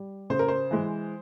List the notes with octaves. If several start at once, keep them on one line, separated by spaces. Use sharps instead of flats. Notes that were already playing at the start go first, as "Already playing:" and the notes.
Already playing: G3
C#3 C5
A#4
C5
E3 G#3